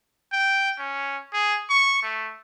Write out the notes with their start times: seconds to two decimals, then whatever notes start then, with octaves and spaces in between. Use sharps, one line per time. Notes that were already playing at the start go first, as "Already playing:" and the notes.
0.33 G5
0.79 C#4
1.33 G#4
1.70 C#6
2.03 A3